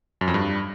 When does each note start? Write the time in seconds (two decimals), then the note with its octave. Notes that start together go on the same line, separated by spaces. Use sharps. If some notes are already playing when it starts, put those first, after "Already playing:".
0.21 F#2
0.28 F2
0.34 G2